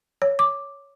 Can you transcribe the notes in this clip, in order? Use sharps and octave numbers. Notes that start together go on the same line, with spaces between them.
C#5
D6